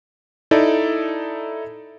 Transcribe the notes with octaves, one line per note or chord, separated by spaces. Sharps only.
D#4 E4 A4 D5